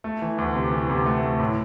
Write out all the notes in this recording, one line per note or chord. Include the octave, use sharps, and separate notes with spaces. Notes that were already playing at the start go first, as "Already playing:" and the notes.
A3
E3
D2
C3
E3
C3
A3
A3
A2